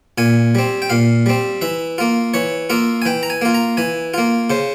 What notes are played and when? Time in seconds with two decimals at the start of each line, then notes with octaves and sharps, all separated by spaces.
0.18 A#2 G#5
0.55 G3 C4
0.82 G5
0.90 A#2 F5
1.26 G3 C4
1.62 E3 E5
1.98 A#3 F4
2.34 E3 C#5
2.70 A#3 F4 E5
3.02 G#5
3.06 E3 G5
3.23 A#5
3.30 G#5
3.41 A#3 F4
3.54 A#5
3.77 E3 G#5
4.14 A#3 F4
4.50 C#3 C5